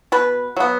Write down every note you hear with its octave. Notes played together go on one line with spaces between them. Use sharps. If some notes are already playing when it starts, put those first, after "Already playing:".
B2 B4
F#3 B3